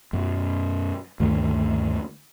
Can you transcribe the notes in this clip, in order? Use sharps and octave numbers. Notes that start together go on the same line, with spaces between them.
F#2 B2
D2 G2 D#3 A3